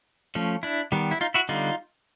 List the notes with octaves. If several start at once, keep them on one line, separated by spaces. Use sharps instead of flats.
F3 A3 C#4
D4 E4
D#3 G3 B3
E4
D#4 F4
E4 F#4
D3 G3 B3 D#4 F4